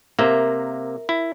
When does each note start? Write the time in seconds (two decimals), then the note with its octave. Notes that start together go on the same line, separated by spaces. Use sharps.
0.19 C3 A#3 A#4 E5
1.09 E4